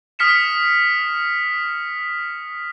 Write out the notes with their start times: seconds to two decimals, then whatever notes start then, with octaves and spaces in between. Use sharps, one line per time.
0.19 D#6 F6 B6 C#7 E7